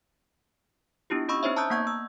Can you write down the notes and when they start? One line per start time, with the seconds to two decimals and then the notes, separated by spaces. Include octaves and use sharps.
1.10 B3 D4 E4 F4 G4
1.29 C#4 D#5 B5 C#6 E6
1.43 C4 D#4 C5 C#5 E5
1.56 A5 A#5 D#6 E6 F#6 G6
1.70 A#3 B3 F#5 C#6 G6 G#6
1.87 E6